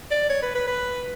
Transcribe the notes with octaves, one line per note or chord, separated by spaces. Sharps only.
D5
C#5
B4
B4
B4